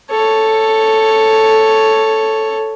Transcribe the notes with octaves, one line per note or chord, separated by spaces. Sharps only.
A4 C#5